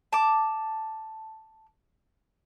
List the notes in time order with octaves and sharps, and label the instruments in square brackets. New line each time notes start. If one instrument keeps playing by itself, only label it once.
[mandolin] A5 D6